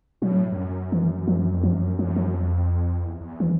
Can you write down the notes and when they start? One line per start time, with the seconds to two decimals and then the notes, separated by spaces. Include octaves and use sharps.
0.22 B2 F#3
0.33 A2
0.52 G2
0.57 F#2
0.92 E3
1.28 F3
1.54 F2
1.63 F#2 F3
1.99 F#2 F3
2.16 F3
2.34 F2
3.04 E2
3.21 E2
3.40 E3